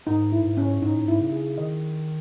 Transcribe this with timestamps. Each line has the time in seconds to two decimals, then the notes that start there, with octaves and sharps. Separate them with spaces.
0.07 G#2 D#4
0.32 E4
0.44 G#2
0.57 C#4
0.82 G#2 D#4
0.93 A2
1.03 G#2 E4
1.20 C#3
1.32 G#4
1.58 D#3 D#5